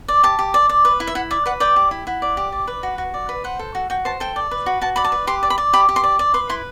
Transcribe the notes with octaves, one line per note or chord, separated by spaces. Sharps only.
D5
G4 A5
G4
D5
D5
B4
E4
E5
E4 F#5
D5 E5
B4 F#5
D5 G5
G4
E4
E4 F#5
D5
G4
D5
B4
F#4
F#4
D5
B4
C5 F#5
A4
F#4
F#4 G5
C5 A5
A4 G5
D5
B4
F#4
F#4 A5
D5 B5
A5
B4
G4 C6
D5
B5
D5
G4 B5
G4
C6
D5
D5
B4 C6
E4 C6